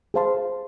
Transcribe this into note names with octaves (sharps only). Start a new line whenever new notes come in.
G#4 C5 F5 A5 C6